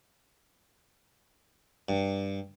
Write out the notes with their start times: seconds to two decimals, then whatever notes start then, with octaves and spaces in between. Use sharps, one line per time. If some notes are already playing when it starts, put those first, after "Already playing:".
1.89 G2